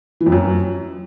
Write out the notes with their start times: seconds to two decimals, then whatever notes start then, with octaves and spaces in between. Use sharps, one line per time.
0.20 E3
0.26 F2
0.32 F#2